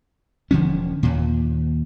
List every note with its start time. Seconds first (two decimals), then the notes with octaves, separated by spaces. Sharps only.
0.51 E1 D3 F3 C#4
1.03 D#2 A#2